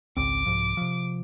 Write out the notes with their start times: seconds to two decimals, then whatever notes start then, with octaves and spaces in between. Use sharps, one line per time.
0.17 G#1 C#2 C4 D6
0.46 C2 G#2 F3
0.77 C3 F3